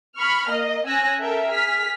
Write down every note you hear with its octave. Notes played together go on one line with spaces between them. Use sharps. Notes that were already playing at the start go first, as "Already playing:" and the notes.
B5 C#6 F6
A#3 D#5
C#4 G#5 E6 F#6 A#6
A4 A#4 E5 G5
G#4 F6 B6